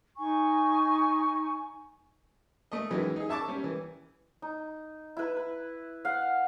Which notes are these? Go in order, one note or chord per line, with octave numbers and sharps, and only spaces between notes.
D#4 G#5 C#6
A3 D#5
F#2 D#3 E3 F#3 G#3
D#4 G#4
E5 A5 C#6 D6
G3 C#4
E3
D#4
E4 B4
B4
F5 F#5